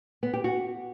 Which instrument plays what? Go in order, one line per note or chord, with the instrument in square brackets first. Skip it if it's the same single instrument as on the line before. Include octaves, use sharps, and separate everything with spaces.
[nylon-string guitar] B3
G4
F#4